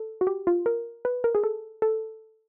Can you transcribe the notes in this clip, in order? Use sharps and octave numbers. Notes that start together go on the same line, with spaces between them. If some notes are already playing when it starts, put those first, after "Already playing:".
Already playing: A4
F#4
G4
F4
A#4
B4
A#4
G#4
A4
A4